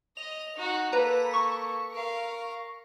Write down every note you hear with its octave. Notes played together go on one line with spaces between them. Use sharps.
D#5 F7
D#4 F#4
A#3 A4 B4 A#5
C#6
A#4 F5